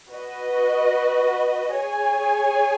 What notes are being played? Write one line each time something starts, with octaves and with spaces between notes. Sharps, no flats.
F#4 B4 D#5
G#4 C#5 G#5